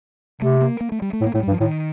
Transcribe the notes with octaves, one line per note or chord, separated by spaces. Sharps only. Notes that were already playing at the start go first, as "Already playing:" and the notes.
C3 A3
A#3
A#3
A3
G3
A3
A2
A#3
A2 A3
G3
G2
F3
A2 D#3